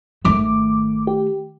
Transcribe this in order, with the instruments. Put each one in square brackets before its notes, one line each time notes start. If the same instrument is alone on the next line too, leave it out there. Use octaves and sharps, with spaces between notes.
[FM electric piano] G#1 D6 [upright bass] D#3 A3
[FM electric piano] G4